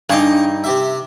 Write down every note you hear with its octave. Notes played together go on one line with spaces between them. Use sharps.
G2 D#4 G#4 C#6 D6
C3 G4 E5